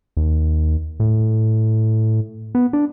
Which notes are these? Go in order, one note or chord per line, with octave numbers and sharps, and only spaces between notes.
D#2
A2
B3
D4